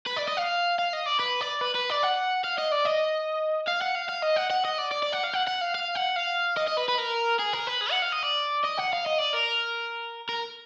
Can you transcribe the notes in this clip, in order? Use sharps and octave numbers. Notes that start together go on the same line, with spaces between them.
B4
D5
D#5
F5
F5
D#5
D5
B4
D5
B4
B4
D5
F#5
F5
D#5
D5
D#5
F5
F#5
F5
F5
D#5
F#5
F#5
D#5
D5
D5
D5
F#5
F5
F#5
F#5
F5
F5
F#5
F5
D#5
D#5
B4
B4
A#4
G#4
A#4
B4
G#4
F#5
F5
D#5
D5
D#5
F#5
F5
D#5
D5
A#4
A#4